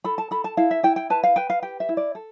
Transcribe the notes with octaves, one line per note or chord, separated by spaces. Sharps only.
A4 B5
A5
A4 B5
A5
E4 F5
E5
E4 G5
G5
B4 A5
F5
B4 G5
F5
G4 G5
E5
E4
D5
A4